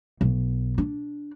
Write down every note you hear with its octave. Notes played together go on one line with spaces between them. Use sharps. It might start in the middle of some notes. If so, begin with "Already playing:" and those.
B1
D4